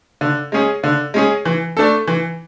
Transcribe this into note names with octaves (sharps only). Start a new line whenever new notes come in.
D3
G#3 C#4 G#4
D3
G#3 C#4 G#4
E3
A3 D4 A4
E3